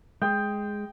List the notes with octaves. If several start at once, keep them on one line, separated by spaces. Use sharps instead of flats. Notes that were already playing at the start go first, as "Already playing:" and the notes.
G#3 G5